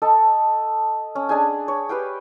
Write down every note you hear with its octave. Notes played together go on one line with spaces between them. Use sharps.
A4 D#5 A5
C#4
D4 G#4 G#5
C#5
G4 B4 F5 G5